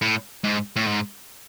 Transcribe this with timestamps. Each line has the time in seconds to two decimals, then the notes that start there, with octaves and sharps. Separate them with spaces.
0.02 A2
0.44 G#2
0.76 A2
0.87 G#2